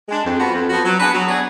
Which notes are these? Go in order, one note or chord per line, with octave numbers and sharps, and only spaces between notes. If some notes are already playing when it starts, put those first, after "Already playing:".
G#3 D4
F2
F3 B3 F#4
F2
F3 B3 F#4
F#3
B3 D4 G#4 B4
F#3
B3 D4 G#4 B4